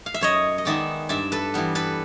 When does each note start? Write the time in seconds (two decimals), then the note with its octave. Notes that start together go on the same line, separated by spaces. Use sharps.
0.06 F5
0.14 E5
0.21 F#2 C#5 D#5
0.58 D#5
0.65 D#3 G#3 B3 D5 E5
1.09 G2 D5 E5
1.32 A4 B4
1.54 E3 G3 B3
1.75 A4 B4